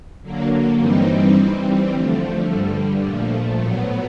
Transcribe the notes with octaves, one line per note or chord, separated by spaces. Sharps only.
D3 F#3 A#3
G2 E3 G3 C4 D#4
E3 G3 C4
D3 F3 A3
G2 D3 G3
A#2 F3 A3
A2 F#3 B3